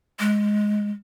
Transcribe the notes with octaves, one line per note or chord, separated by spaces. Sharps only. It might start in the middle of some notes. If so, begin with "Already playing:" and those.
G#3